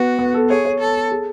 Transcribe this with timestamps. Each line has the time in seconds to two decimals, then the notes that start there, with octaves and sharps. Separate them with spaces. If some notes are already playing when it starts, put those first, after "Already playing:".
Already playing: B3 F#4
0.18 B3
0.34 A4
0.49 G#4 C#5
0.65 C#5
0.80 A4
1.11 G#4